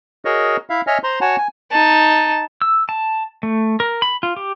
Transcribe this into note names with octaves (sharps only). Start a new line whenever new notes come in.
F#4 G#4 A#4 C#5 D#5
E4 E5 F5
C#5 D#5 E5 G#5 F6
C5 A#5 C6
F#4 C#5 F#5 G#5 A5
G#5
D#4 A5
E6
A5
A3
A#4
B5
F4
G4